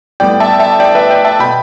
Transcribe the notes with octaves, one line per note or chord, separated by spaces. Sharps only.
A2 G3 B3 D5 G5
E5 A5
E5 A5
D5 G5
B4 E5
D5 G5
E5 A5
B2 B3 G5 B5